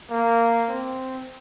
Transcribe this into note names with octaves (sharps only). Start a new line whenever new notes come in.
A#3
C4